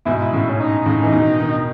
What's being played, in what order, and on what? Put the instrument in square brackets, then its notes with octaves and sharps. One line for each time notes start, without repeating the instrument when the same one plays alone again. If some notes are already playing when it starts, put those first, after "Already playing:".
[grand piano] G#2 B2 [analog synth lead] E4
[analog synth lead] E4
[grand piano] A2 C#3
[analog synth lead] C#4
D#4
[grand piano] A2 C#3
E3
B2 D#3
B2 D#3